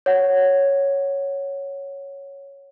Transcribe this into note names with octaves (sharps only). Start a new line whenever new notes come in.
C#5 F#5